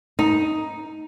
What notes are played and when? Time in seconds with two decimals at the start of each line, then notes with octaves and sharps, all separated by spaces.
0.19 D#4